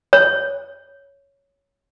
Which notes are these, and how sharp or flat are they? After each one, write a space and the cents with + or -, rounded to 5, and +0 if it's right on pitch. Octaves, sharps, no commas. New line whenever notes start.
C#5 +5